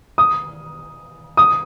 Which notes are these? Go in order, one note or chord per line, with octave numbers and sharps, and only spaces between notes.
D#6
D#6